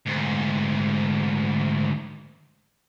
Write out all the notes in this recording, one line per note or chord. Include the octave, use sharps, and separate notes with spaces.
D2 G#2